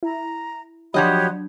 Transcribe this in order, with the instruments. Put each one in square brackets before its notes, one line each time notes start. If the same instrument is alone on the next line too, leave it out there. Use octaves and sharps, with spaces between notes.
[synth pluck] E4 [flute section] A#5
[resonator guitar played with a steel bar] F3 F#4 D#5 [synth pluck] F#3 D4 [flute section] G4 C#5 B5